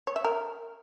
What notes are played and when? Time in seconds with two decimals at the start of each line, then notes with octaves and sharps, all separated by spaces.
0.07 C#5
0.16 E5
0.24 A#4